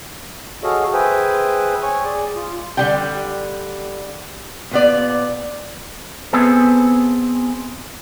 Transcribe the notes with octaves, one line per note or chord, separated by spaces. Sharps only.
F#4 G#4 A4 C#5 D#5 F5
G#4 B4 C5 E5 G5 G#5
C#5 G#5 C#6
G#4 D5
F4
D3 G3 G5
A#2 B3 D5
B3 C4 G#4 A4